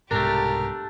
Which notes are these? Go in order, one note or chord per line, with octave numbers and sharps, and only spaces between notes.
C2 G#2 B2 A3 D4 G4 A#4